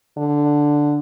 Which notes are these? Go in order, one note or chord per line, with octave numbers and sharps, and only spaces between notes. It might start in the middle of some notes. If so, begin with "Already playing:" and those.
D3